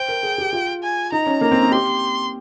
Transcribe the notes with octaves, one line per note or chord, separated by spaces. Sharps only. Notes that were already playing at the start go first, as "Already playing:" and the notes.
Already playing: C5 G5
A#4
G#4
G4
F4
G#5
D#4 A#5
C#4
A#3 A#5
C4
D#4
G4 C6